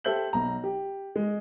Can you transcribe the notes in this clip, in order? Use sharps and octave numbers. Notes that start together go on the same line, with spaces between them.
G4 A4 C5 E5 G6 F#7
B1 A#5
G4
G#3